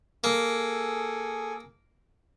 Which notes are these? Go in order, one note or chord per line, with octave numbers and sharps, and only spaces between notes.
A#3 G#4 A4